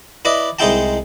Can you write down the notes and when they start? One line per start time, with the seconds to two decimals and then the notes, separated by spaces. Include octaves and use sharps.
0.25 E4 B4 D5 D#5
0.59 C2 G#3 D#4 E4 G5 A5